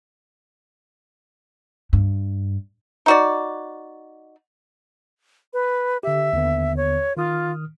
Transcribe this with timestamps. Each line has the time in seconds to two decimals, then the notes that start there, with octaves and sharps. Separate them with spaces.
1.93 G2
3.06 D#4 F#4 D5
5.53 B4
6.03 D3 G4 E5
6.33 D#2 D3 B3
6.77 C#5
7.17 D#3 F4 D#6 F6